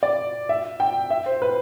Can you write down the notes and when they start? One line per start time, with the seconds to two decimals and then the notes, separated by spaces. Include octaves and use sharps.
0.03 D5
0.49 E5
0.80 G5
1.10 E5
1.26 C5
1.42 B4